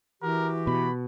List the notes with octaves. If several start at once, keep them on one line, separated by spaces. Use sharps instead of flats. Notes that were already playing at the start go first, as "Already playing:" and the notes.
E3 F#4 G4 A#4
B2 B5